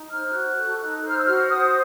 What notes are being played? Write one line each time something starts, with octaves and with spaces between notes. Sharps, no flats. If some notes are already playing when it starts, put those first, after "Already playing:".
Already playing: D#4
C5 F6
F#4 F#6
A4
D#4
C5 F#6
F6
E6
F#4 F6
C5 D#6